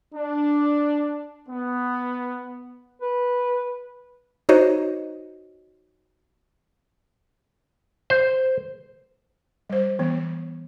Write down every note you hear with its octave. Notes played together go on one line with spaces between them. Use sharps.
D4
B3
B4
D#4 F#4 C5 C#5 D#5
C5
G3 C5
E3 B3